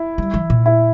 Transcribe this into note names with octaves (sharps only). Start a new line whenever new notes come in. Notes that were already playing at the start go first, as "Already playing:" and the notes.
Already playing: E4
G3
E3
A#2
E4